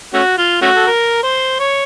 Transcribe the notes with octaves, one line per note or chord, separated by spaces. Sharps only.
A3 C#4 F#4
F4
A3 C#4 F#4
A4
A#4
C5
C#5